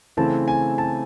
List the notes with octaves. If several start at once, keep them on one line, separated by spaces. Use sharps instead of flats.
C#3 E3 A3 C4 E4 A5
G#5
A5